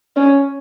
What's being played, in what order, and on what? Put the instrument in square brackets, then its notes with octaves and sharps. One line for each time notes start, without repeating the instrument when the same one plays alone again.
[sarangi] C#4